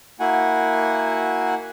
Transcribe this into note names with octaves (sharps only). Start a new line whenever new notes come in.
A#3 E4 F#4 F#5 G#5